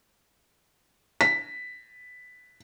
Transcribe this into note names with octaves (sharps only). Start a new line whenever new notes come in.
B6